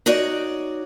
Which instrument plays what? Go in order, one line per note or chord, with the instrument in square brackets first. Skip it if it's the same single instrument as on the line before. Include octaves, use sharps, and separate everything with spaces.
[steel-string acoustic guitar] D#4 F#4 C#5 D5